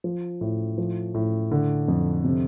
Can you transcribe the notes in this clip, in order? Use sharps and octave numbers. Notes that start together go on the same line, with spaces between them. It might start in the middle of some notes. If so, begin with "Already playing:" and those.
F3
A2
F3
A2
D3
F2
C3